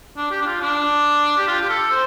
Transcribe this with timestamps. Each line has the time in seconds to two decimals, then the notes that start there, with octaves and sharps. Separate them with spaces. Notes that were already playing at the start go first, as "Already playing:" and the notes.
0.17 D4
0.31 G4
0.42 D4
0.47 F4
0.61 D4
1.38 G4
1.48 F4
1.61 G4
1.70 A4
1.91 C5